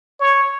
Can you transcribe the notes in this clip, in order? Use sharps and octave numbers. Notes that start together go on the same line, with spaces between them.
C#5